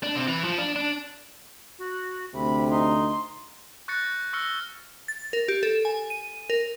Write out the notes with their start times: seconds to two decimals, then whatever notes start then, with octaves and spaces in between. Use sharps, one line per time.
0.03 D4
0.15 C3
0.28 E3
0.44 F3
0.58 D4
0.76 D4
1.79 F#4
2.34 D2 C3 B5
2.71 D#4 C6
3.88 C#6 F#6 G6 A6 A#6 C#7
4.33 C#6 E6 F6 A#6 C#7 G7
5.08 A6
5.33 A#4
5.48 G4
5.63 A4
5.85 G#5
6.10 D#7
6.50 A#4